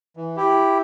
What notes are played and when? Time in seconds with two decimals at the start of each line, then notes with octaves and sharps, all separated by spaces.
0.17 E3
0.37 E4 G4